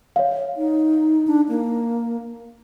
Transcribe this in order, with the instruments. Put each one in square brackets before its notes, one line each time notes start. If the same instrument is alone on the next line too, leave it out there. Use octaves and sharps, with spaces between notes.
[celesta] C#5 E5 F5
[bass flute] D#4
D4
A#3